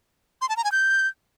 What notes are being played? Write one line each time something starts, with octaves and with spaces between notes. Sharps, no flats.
C6
A5
A#5
G#5
G6